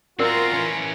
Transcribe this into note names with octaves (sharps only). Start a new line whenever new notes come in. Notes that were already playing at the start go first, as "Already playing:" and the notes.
C4 F4 F#4 A#4 D5 A#5 C6
E3 C#4